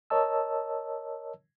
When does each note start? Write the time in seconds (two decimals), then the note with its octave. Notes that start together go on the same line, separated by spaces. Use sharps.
0.10 A#4 C#5 D#5 A5 E6